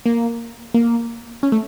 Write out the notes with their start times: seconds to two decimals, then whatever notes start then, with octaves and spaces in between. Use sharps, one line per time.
0.06 A#3
0.74 A#3
1.43 C#4
1.52 A3